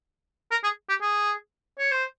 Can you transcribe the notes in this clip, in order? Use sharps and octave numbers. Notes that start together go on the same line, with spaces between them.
A#4
G#4
G4
G#4
C#5
C5